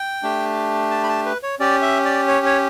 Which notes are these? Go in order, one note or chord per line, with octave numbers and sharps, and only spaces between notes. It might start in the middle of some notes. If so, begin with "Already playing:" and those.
Already playing: G5
A3 D4 G4
A5
B5
A5
B4
C#5
C#4 G4 D5
E5
D5
C#5
C#5